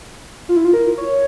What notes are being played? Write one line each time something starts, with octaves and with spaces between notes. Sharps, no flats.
F4
E4
F4
A#4
C#5